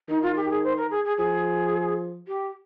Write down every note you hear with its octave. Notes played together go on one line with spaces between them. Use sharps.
D#3 D#4
F4
G4
G#4
C5
A#4
G#4
G#4
F3 G#4
G4